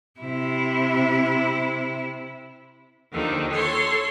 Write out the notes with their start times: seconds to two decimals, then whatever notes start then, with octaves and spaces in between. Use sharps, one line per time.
0.20 C3 E4
3.12 D#2 D3 D#3 F3
3.53 A4 C#5 C6